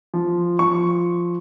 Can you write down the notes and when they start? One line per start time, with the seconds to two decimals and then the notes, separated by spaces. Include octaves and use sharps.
0.14 F3
0.59 F3 C#6